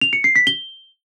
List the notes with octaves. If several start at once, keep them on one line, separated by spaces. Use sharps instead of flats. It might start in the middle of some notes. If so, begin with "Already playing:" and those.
F7
C#7
C7
B6
G7